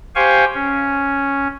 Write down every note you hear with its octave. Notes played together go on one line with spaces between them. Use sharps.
G4 C5 F5 G5 G#5 C#6
C#4